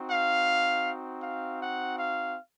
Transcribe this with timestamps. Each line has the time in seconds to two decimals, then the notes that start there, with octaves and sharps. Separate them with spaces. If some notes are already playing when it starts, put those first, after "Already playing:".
Already playing: C4 D#4 F#4
0.10 F5
1.23 F5
1.61 F#5
1.98 F5